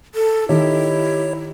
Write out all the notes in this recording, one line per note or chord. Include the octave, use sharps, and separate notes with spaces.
A4
D#3 E4 G4 C#5